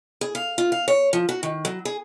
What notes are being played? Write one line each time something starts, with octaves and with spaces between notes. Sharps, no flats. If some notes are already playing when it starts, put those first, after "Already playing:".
G#4
F5
F4
F5
C#5
F3
F#4
D#3
F#3
G#4